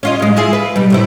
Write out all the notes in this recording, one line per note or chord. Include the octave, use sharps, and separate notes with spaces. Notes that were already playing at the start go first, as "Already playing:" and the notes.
C#4 F4 D#5
A2 G#3
E4 F4 G#4
B4
B2 G3
A2 C3 E4